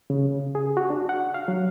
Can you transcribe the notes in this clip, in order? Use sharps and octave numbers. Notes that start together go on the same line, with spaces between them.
C#3
G#4
F#4
D4
F#5
F5
F#3